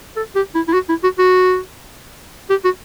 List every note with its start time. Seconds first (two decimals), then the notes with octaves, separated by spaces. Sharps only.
0.16 A4
0.35 G4
0.55 E4
0.68 E4
0.74 F#4
0.89 E4
1.04 F#4
1.19 F#4
2.50 G4
2.64 F#4